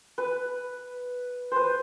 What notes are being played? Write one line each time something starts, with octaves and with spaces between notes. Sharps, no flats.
B4
B4 C5